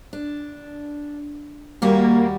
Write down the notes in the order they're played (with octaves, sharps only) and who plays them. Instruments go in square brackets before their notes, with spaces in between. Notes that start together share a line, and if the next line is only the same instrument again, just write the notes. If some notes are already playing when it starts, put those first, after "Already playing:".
[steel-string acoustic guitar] D4
[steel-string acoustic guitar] D#2 G3 F#4 [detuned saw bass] A#3